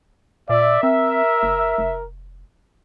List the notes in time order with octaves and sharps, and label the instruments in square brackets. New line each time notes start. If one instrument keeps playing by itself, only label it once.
[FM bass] A#2 [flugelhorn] D5 [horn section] E5
[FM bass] C4 [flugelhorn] A#4
[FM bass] F#1
F1